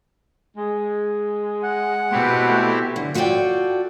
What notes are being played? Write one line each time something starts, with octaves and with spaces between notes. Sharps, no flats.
G#3
F#5
B2 C4 E4 G4
E3 A3
D3
F4 F#4 A4 B4 D5 G5